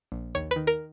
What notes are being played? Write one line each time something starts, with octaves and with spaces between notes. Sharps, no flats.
A#1
D#2 C#5
B4
D#3
A#4